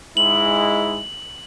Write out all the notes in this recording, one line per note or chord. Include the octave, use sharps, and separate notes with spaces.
G#2 G#3 E4 F#7